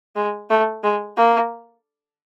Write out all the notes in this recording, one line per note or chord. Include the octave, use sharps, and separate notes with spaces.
G#3
A3
G#3
A#3